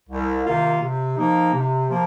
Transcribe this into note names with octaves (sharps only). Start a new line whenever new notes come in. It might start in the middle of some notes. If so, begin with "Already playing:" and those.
C2
C3 D#3 A#3 F4
C3
F3 A#3 D#4
C3
F3 A#3